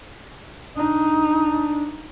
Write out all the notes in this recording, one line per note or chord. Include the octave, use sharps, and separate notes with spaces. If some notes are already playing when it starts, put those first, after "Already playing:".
D4 D#4